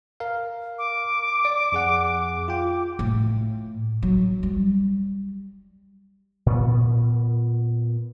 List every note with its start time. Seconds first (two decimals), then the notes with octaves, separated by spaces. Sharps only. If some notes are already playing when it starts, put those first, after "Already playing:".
0.20 A#4 F5
0.78 D6
1.45 D5
1.72 F2 G#4 F#5
2.48 F4 G5
2.99 A2
4.03 F#3
4.43 G3
6.46 A#2 B3